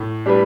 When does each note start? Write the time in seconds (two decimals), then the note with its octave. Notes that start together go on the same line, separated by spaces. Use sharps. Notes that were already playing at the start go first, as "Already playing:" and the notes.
Already playing: A2
0.26 G3 D4 G4 B4